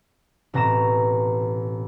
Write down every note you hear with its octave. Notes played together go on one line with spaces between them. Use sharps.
A1 B2 C4 A#5 A#6 E7